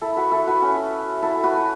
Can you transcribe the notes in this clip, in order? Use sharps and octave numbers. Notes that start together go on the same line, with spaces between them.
E4 A4
F#4 B4
E4 A4
F#4 B4
C#4 F#4
E4 A4
F#4 B4